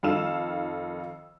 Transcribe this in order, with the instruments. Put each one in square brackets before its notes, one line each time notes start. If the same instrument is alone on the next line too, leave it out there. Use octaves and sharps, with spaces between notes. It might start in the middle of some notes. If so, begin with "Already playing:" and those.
[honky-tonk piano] F2 D#3 A4 F5 E6 E7